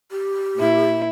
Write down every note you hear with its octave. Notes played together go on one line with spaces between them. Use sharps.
G4
A#2 E4